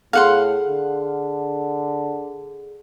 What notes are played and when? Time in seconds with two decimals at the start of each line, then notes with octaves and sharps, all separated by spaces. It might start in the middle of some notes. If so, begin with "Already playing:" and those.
0.13 A2 G#4 A4 F5 F#5 C6
0.68 D3